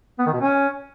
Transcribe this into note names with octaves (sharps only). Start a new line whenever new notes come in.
B3
D#3
B2
C#4